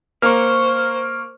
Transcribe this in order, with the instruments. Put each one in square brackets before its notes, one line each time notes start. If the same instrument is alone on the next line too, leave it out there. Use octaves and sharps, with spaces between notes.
[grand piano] A#3 A#4 [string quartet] C5 [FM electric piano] C#6 F6